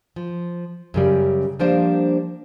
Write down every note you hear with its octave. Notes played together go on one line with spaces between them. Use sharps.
F3
F#2 C#3 G3
F3 G3 A#3 D4 C5